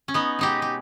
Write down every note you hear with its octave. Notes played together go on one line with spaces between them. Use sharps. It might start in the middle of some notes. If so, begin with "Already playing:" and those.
C#4
B3 D#4
B2 G#3 D#4 G4
G4